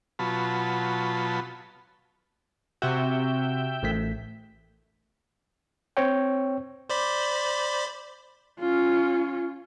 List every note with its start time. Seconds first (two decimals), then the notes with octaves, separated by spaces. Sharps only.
0.19 B2 F#3 F4 A5 B5
2.82 C3 F#4 E5 G5
3.83 A1 A3 B6
5.97 C4 C5 C#5 G5
6.89 C5 D5 B5
8.60 C#4 F4